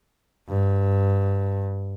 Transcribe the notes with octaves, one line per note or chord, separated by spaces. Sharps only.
G2